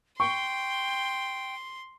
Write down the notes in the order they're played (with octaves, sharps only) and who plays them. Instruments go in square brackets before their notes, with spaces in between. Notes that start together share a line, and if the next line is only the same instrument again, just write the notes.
[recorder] G5 [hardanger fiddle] C6 [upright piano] C#6